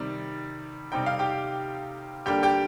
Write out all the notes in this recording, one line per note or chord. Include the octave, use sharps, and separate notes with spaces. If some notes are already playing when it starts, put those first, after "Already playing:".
Already playing: C3 D#3 G3
C3 G3 C4 D#4 G5
F5
G4 G5
D3 G3 A#3 D4 G4 G5
G4 G5